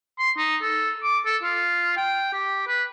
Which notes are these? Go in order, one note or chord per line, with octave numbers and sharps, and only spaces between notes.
C6
D#4
A4
D6
A4
F4
G5
G4
B4